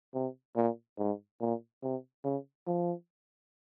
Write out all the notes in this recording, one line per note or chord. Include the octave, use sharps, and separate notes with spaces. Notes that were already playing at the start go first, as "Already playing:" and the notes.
C3
A#2
G#2
A#2
C3
C#3
F3